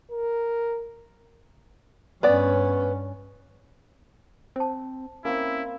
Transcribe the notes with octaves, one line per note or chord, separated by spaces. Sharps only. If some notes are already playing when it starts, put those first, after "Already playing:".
A#4
G2 B3 C#4 D5
C4 C5 A5
A#3 C4 C#4 E4